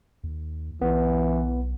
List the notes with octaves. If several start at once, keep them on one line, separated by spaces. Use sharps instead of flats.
D#2
B1 E3 B3